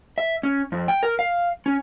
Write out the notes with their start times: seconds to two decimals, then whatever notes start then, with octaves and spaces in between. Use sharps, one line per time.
0.18 E5
0.43 C#4
0.72 F2
0.88 G5
1.03 A#4
1.19 F5
1.66 C#4